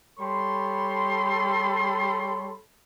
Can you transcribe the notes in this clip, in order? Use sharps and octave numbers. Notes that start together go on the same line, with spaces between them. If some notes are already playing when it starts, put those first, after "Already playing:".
G3 A4 C#5 B5 C6